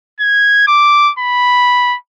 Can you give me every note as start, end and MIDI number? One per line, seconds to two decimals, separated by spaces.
0.20 0.66 92
0.67 1.11 86
1.19 1.96 83